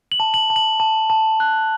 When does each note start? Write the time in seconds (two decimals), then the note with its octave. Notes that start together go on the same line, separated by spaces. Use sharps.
0.12 F#7
0.20 A5
0.34 F#7
0.50 A5
0.56 F#7
0.80 A5
1.10 A5
1.40 F#6